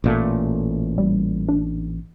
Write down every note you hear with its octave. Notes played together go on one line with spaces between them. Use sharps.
A1 A#2 A3
G3
D4